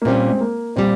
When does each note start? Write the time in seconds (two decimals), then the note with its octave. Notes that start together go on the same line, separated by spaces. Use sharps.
0.02 A#3
0.05 A#2 G3 C4 C#4
0.30 G#3
0.41 A#3
0.76 A#2 G3 C4